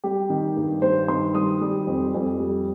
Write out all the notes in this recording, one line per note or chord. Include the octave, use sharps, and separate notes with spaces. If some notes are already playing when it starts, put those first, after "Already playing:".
G3 G4
D#3
G2
G2 C5
D#3 C6
G3 D#6
G3
F2
F2
G3